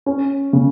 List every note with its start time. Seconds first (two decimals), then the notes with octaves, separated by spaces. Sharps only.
0.06 C#4
0.53 C#3